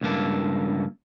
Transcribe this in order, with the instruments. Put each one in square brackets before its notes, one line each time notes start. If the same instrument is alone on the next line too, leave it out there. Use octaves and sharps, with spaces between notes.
[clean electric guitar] C#2 G2 A#3 A4